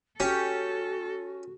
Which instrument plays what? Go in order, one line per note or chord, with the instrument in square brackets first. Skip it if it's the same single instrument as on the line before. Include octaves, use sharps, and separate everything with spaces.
[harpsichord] C#4 [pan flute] F#4 [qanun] G4 [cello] A4